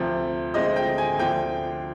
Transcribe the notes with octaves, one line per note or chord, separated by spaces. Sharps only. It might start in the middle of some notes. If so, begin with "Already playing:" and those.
Already playing: D2 C3 F3 C4
D2 D3 G#3 C4 D#5
G5
G#5
D2 D3 F3 C4 G5